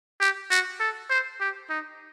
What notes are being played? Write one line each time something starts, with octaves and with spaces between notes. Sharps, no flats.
G4
F#4
A4
C5
G4
D#4